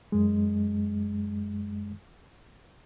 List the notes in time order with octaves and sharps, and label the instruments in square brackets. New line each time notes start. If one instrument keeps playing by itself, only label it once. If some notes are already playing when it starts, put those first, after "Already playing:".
[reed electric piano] F#2 G#3